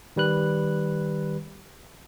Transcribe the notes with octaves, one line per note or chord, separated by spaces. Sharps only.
D#3 G3 B4 F#6